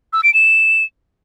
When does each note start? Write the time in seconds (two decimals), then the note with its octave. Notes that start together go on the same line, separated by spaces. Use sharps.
0.13 E6
0.23 D7
0.34 E7